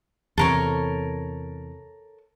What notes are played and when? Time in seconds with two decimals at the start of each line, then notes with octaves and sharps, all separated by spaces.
0.38 E2 C3 A4 A#4 C#5